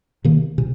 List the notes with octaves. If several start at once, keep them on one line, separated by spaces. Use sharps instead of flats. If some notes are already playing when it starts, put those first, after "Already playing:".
C3 D#3 A#3
C3